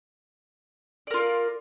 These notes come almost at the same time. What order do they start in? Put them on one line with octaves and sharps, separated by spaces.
D5 A#4 F4